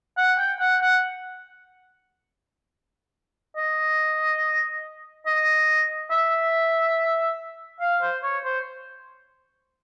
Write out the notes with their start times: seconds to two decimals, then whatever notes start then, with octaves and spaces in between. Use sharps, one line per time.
0.17 F#5
0.38 G5
0.60 F#5
0.81 F#5
3.56 D#5
5.26 D#5
6.11 E5
7.81 F5
8.02 C5
8.23 C#5
8.44 C5